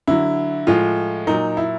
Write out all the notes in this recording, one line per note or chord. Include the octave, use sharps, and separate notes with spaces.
D3 F#3 E4
A2 F3 G#3 F4
A#2 F#3 D#4
E4